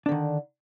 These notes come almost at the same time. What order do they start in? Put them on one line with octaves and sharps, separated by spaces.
D4 D3 D#3